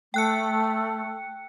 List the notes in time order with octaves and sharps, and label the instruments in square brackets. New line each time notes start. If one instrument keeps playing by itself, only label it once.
[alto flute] A3 [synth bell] G5 F#6 C#7